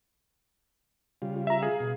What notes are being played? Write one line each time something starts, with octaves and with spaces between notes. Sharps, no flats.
C#3 G3 F4
E5 A#5
G#4 F5
B2